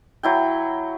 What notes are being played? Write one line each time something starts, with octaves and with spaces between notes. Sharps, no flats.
F#3 E4 G5